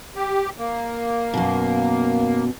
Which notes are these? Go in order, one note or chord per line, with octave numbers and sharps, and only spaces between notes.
G4
A#3
F#2 B2